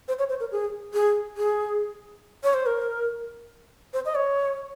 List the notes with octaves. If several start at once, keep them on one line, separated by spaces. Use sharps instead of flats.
C5
C#5
C5
A#4
G#4
G#4
G#4
C#5
C5
A#4
C5
D#5
C#5